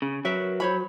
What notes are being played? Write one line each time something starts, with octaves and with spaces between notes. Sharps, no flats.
C#3
F#3 A#4 B4 E5
C5 C#5 B5